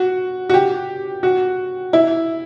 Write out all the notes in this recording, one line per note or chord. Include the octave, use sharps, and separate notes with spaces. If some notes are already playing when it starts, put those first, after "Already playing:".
Already playing: F#4
F#4
G4
F#4
E4